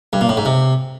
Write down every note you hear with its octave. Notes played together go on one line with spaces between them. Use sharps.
G2
A#2
A2
G#2
C3